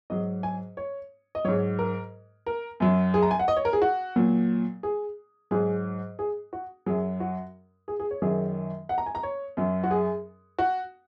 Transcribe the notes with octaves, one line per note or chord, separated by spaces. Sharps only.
G#2 F#3 D#5
G#5
C#5
D#5
G#2 F#3 C#5
A#4
A#4
F#2 F#3
G#4
A#5
G#5
F#5
D#5
C#5
A#4
G#4
F#4
A#2 F#3
G#4
G#2 F#3 G#4
G#4
F#4
F#2 F#3 G#4
F#4
G#4
G#4
C#5
F#2 D#3 F#3 G#4
F#5
A#5
G#5
A#5
C#5
F#2 F#3
F#4
G#4
F#4